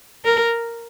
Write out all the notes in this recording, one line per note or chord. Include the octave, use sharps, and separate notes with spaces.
A#4